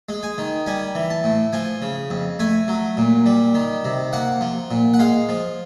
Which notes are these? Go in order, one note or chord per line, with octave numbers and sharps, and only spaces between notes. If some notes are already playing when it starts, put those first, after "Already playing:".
G#3
G#5
D#3
G3 G#5
E3
A5
A2
F3 G#5
C#3
F2
A3 G#5
F#3
A#2
G3
D#3
C3
A#3 F#5
F3
A#2
F#5
G#3 F5
F3